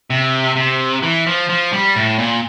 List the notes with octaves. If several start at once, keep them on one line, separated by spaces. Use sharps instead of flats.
C3
C3
E3
F3
F3
G3
A2
A#2